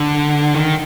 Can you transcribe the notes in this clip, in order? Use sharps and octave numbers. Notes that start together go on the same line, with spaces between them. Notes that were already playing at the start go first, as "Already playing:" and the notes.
Already playing: D3
D#3